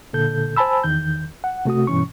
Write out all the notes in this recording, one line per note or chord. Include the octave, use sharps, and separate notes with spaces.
A#2 D3 A4 G6
C5 G#5 A5 B5 E6
E2 D#3 G6
F#5
C3 A3 F#4 D#6
G2 B2 E3 C#4 C#6